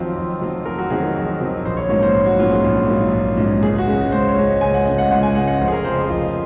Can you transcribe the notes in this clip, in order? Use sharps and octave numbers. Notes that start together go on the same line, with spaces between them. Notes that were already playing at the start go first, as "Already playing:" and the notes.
Already playing: F2 D#3 F#3 C4 F4
F2
D#3 F#3 C4
F2 A#4
F#4
D#3 F#3 C4 G#4
A#4
F2
D#3 F#3 C4
A#1 C5
C#5
G#2 F#3 A#3 C#4 C#5
C5
A#1
F#4
G#2 F#3 A#3 C#4 F4
G#4
A#1
G#2 F#3 A#3 C#4
A#1
G#2 F#3 A#3 C#4
C#2 G#4
F#4
C#3 G#3 C#4
C#2 C5
C#5
C#3 G#3 C#4
C#2 G#5
F#5
C#3 G#3 C#4 D#5
F#5
C#2 F#5
G#5
C#3 G#3 C#4 F#5
F#5
F1 C5
G#4
A#4
F2 C#3 C5
D#5
F1 F4